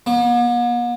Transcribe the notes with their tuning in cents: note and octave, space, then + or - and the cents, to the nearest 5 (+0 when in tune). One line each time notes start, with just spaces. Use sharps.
B3 -45